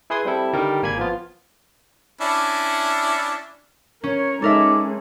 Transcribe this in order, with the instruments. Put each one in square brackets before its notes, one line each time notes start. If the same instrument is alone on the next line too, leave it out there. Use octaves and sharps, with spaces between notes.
[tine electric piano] E4 G#4 B4 G#5 C6 D#6
G3 C4 E4 A4
D3 D#3 G3 A#4
G#1 A#3 G#5 B5 G#6
F3 B3 F4
[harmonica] C#4 D4 E4
[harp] C#4 [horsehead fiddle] A#4 C#5
[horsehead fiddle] G#3 C#4 [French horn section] D#4 [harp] A4 A#4 E5 [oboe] D5